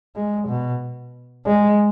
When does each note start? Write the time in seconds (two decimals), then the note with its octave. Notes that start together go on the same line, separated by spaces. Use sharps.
0.16 G#3
0.48 B2
1.46 G#3